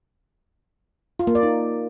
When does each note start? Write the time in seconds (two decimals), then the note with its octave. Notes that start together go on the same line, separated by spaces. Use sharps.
1.19 F4
1.27 A#3
1.35 D5
1.43 D#4